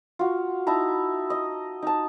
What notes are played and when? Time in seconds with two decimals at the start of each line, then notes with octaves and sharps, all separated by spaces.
0.19 F4 F#4
0.67 D#4 E4 A5 A#5
1.30 D#5
1.82 D#4 A5